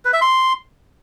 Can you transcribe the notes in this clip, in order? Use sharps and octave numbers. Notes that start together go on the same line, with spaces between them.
B4
E5
C6